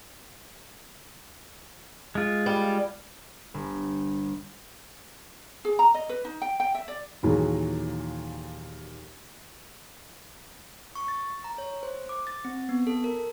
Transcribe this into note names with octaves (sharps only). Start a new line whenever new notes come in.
G#3 F4
G3
G1
G#4
A#5
D#5
B4
D#4
G5
G5
E5
D5
D#2 A#2 E3 F#3 G#4
C#6
A6
A#5
C#5
C5
D6
A6
C4
B3
A4
A#4